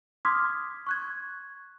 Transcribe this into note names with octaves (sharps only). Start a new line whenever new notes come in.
C6 D6 D#6 F6 G#6 B6
C#6 F#6 G#6